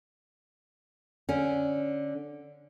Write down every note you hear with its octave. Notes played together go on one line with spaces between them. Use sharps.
D3 C#4